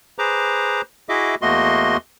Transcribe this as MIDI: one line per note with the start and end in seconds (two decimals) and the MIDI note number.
0.19 0.82 68
0.19 0.82 71
0.19 0.82 72
0.19 0.82 82
0.19 0.82 86
1.09 1.35 64
1.09 1.35 66
1.09 1.35 68
1.09 1.35 75
1.09 1.35 76
1.09 1.35 86
1.42 1.97 40
1.42 1.97 57
1.42 1.97 58
1.42 1.97 66
1.42 1.97 75
1.42 1.97 84